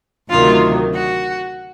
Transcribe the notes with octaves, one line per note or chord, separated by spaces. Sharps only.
D2 C3 D#3 F#3 F4
F#4